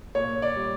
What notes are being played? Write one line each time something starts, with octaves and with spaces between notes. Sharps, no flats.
A#2 C#5
D5
G3